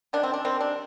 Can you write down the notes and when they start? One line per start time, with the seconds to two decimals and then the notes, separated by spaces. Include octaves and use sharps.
0.13 C3 D#3 G3 D4
0.23 C4
0.34 D4
0.45 C3 D#3 G3 C4
0.61 D4